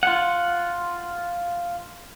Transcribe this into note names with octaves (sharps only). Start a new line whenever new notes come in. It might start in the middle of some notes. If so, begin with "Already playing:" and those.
F4 F#5